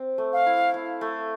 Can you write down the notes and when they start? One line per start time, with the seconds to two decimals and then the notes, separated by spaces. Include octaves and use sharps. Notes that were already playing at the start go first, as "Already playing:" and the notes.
Already playing: C4
0.18 A3
0.33 F5
0.46 E4
0.74 E4
1.01 A3